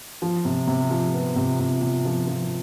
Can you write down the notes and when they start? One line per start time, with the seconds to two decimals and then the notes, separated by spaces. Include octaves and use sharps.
0.22 F3
0.45 C3
0.67 C3
0.91 F3
1.14 B3
1.36 C3
1.60 C3
1.82 C3
2.05 F3
2.27 F3